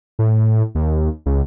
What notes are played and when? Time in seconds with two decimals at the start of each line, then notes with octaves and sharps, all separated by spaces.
0.19 A2
0.75 D#2
1.26 C#2